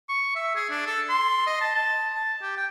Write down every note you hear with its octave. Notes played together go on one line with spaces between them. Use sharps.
C#6
E5
G#4
D4
A4
C6
D#5
A5
A5
A5
G4
G5